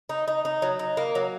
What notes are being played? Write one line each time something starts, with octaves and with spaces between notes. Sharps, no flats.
D#4
D#4
D#4
F#3
D#4
A#3
F#3